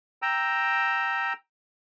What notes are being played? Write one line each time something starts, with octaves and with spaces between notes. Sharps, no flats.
G5 A#5 E6